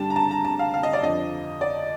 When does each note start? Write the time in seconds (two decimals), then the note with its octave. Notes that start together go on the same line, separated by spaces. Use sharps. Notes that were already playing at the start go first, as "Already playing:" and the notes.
Already playing: G2 D3 G3 A5
0.10 A#5
0.16 A5
0.31 A#5
0.45 A5
0.59 F5
0.74 F5
0.83 D#5
0.93 D5
1.02 F2 D3 F3 D#5
1.61 D5